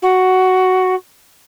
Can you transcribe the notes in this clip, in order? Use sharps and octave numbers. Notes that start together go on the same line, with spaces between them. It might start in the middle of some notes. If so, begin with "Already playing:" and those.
F#4